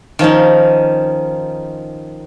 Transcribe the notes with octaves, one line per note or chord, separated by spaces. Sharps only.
D#3 F3 C#4 D#4